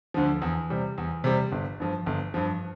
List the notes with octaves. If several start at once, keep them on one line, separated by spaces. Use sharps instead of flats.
D2 D3 F3
E2
C3 G3
E2
C3 G3
G1
G2 F3
G1
G2 F3